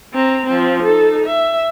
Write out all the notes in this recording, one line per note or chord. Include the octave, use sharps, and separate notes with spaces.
C4 A#5
F3 C4
D#4 A4
E5